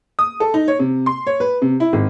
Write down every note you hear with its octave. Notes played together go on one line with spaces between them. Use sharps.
D#6
A4
D#4
C#5
C3
C6
C#5
B4
C3
E4
G#1